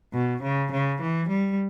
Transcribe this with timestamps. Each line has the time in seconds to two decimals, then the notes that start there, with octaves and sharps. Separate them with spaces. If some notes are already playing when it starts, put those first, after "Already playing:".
0.14 B2
0.43 C#3
0.72 C#3
1.01 E3
1.29 G3